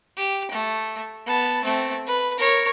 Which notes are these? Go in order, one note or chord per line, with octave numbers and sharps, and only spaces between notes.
G4
A3
B3 A5
A3 C4
B4
A#4 C#5